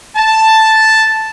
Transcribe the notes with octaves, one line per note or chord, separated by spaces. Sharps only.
A5